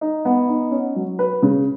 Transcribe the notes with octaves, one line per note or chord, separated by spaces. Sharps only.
D#4
B3
D#4
C#4
F#3
B4
C#3